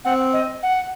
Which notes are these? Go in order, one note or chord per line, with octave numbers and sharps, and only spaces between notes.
C4 F#5
D#5
F#5